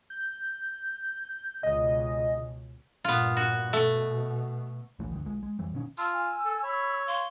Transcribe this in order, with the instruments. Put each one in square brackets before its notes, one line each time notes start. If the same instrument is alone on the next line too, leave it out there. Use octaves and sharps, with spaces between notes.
[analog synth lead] G6
[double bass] C#2 B2 [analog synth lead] D#5
[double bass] G2 A#2 [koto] B3 F4
[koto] F#4
[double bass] B2 [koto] A3
[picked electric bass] D1 A#1 E3 A3
D2 G2 D#3
B1 G#3
G#3
F2 E3 G3
E1 B2 D#3 C#4
[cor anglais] F4 [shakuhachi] A5 [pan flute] E6
[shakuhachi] G#5
[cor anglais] A4
[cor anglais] C#5 [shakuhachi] B5
[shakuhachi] F5 [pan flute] C6